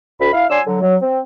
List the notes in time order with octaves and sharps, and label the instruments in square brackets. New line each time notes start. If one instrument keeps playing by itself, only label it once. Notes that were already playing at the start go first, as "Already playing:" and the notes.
[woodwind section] D2 B5
E4 F5
F#3 D4 D5 G#5 C6 E6
D3 F#3
F#3
C4